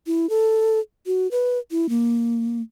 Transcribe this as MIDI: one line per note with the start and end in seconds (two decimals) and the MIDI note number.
0.07 0.29 64
0.30 0.79 69
1.07 1.30 66
1.31 1.59 71
1.71 1.89 64
1.89 2.61 58